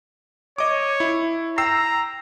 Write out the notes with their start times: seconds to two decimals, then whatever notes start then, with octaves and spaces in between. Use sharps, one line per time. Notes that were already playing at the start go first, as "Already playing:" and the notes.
0.58 C#5 D#5 D6
1.00 E4
1.58 G5 A#5 E6 C7